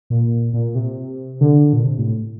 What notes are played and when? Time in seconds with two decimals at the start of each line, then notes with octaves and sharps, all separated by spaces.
0.10 A#2
0.54 A#2
0.75 C3
1.41 D3
1.73 A#2
1.84 C3
1.98 A2